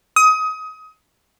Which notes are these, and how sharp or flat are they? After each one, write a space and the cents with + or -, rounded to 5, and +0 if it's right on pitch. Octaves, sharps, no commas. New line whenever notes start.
D#6 +25